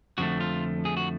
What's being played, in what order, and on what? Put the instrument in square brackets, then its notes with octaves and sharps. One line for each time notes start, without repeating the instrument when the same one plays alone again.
[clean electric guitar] F2 D3 F3 A3 F#4
F4
G#4
F#4